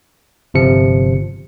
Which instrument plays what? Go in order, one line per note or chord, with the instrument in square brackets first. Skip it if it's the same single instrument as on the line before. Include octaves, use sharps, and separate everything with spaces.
[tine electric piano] G1 C3 F3 C#7